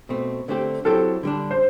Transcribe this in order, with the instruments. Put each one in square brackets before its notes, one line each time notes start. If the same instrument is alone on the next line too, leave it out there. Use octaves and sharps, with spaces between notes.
[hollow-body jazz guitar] B2 A3 C4
D3 A3 C4 G4
[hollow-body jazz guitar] F#3 C4 E4 G4 [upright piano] A4
[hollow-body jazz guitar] D3 G3 D4
[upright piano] C5